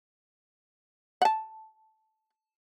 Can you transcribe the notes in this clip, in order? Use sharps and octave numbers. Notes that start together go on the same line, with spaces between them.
F#5 A5